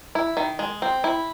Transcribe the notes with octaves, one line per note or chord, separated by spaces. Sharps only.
E4
D#3
G#3
C4
E4